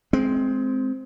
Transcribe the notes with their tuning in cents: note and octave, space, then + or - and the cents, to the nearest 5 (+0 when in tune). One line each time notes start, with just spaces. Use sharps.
G#3 +25 C4 +0